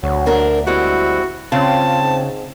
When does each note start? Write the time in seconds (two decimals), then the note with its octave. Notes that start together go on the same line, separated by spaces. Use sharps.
0.03 D2 F#3
0.26 C4 D4 A#4
0.67 G3 G#3 C4 E4 F#4
1.52 C#3 C4 F4 A5
2.01 G#2